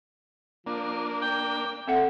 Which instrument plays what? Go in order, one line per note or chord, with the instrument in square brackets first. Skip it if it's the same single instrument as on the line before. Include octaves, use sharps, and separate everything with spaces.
[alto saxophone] F3 [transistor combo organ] A#3 D4
[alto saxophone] G5
[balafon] C4 A4 F#5 [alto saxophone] E5